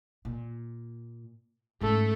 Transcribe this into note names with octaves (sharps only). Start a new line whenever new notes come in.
A#2
G#2 A3 C#4 A4